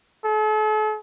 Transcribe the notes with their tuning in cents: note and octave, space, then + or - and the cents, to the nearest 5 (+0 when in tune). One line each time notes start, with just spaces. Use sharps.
A4 -40